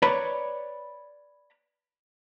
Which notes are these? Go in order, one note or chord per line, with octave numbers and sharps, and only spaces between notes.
B4 C#5 D5 A#5 B5